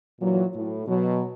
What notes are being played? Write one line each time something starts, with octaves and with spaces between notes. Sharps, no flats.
A#2 E3 F#3
A2
B2 F#3